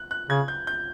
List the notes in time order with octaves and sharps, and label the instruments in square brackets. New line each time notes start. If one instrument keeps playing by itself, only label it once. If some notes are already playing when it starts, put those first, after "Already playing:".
Already playing: [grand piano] F#6
F#6
[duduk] C#3 [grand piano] G#6
[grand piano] G6
G6